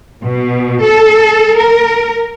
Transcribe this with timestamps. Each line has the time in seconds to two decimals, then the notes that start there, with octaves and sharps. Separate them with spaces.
0.22 B2
0.83 A4
1.57 A#4